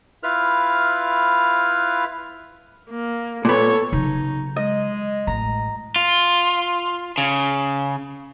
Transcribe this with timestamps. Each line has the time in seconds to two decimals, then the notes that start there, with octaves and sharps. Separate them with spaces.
0.23 E4 F4 B4 F6
2.90 A#3
3.45 A#2 B3 A4 C#5
3.93 C#3 F#3 D#4
4.56 G#3 D#5
5.27 A1 A#5
5.96 F4
7.18 C#3